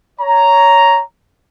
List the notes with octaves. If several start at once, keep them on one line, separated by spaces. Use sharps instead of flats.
C#5 A#5